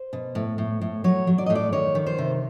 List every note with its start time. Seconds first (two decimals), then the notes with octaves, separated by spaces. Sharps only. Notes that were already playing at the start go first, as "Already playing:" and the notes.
Already playing: C5
0.13 B2
0.35 A2
0.58 A2
0.81 A2
1.04 F#3 C#5
1.27 F#3
1.38 D5
1.46 D#5
1.50 A2
1.55 D5
1.72 D#3 C#5
1.95 D#3
2.07 C5
2.18 C3